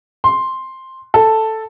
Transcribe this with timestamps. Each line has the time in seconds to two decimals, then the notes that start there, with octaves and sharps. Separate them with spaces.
0.24 C6
1.14 A4